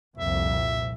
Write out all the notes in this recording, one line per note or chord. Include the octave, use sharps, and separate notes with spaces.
C2 F2 A#2 E5